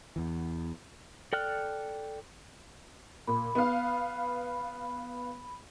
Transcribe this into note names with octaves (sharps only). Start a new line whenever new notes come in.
E2 E3
A4 D5 G5 F6 F#6
A#2 B5
B3 F5